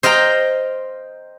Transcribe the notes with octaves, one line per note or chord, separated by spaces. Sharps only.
C5 D#5 F5 G5 A#5